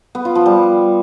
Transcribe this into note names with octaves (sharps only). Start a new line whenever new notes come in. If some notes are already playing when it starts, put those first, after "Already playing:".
B3
F4
F3
G3